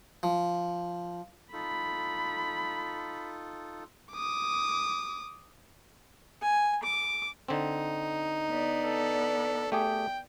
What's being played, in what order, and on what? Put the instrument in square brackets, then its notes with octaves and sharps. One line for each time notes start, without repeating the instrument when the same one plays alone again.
[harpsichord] F3
[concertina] D#4 F4 A4 [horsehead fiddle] B5
[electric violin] D6 D#6
[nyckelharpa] G#5
D6
[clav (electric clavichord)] D3 C4 [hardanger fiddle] D#4
[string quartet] B3 D5
[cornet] A4
[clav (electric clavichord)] A3 G4 G#4 [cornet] G5